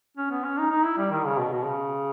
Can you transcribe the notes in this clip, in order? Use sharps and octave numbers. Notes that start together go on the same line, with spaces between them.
C#4
B3
C#4
D#4
D#4
E4
G3
D#3
C#3
B2
B2
C#3